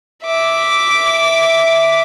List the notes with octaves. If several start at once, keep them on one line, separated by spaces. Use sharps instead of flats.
E5 D6